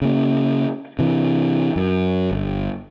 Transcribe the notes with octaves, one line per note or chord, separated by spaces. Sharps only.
C#3 A#3
C3 E3
F#2
G1